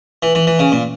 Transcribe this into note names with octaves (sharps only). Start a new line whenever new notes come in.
E3
E3
E3
C#3
A#2